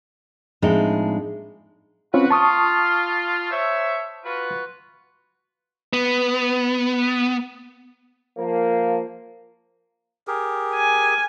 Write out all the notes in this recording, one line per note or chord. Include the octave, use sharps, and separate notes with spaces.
A2 F3 G#3 C4 D4 D#4
C4 C#4 F4 F#4 B4
F4 A5 C#6 D#6
C5 C#5 E5
F4 F#4 B4
B3
F3 A#3
G4 G#4 A#4
G#5